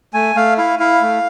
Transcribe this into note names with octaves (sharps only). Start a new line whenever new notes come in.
A3 G#5
A3 F5
E4 F5
E4 F5
A3